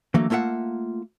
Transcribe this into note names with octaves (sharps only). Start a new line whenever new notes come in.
D3 E3 F#3 A3 A#3
A3 A#3 F4 E5 F#5